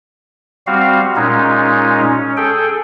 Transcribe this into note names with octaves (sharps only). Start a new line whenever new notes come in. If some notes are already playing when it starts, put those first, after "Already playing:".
G3 C4 F#4 F5
A#2 G#3 C#4 D#4
C#4
G#4 A4 G5